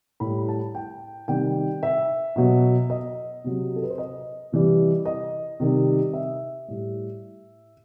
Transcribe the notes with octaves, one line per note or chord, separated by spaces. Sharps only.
A2 G3 B5
A5
G5
C3 D#3 G3 G5
E5
B2 F#3
D#5
C3 F#3
A4
B4
C5
D#5
C3 E3 G3
D#5
C3 D#3 G3
E5
A2 G3